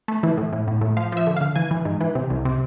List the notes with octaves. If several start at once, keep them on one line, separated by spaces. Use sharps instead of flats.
A3
E3
A2
A2
A2
A2
F3 F5
F3 E5
D3
F5
D3
E3 G#5
E3
G#2
E3
C3
C2
C3